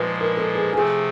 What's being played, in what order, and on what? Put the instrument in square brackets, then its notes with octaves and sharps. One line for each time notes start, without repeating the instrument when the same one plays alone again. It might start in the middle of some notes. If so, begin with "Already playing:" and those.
Already playing: [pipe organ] A#2 F3 G#3 [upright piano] B4
[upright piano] A#4
A4
G#4
[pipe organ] C3 F3 A3 C4 [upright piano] G#4